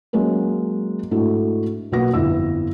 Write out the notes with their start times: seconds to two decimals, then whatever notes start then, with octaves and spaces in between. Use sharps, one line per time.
0.13 F#3 G#3 A#3 C#4 A#4
1.11 G#2 G#3 A3 D4 E4 F#4
1.92 B1 A#3 B3 F#4 A#6
2.14 G1 F2 E4 E6